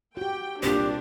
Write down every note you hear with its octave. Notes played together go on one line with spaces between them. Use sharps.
F#4 G4 G5
C2 A#2 C4 D4 G4 C5